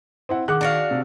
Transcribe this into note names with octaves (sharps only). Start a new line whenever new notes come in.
C4 E4 F#5
D#3 G#4 F#5 D6 F#6
D4 F#4 F5
C3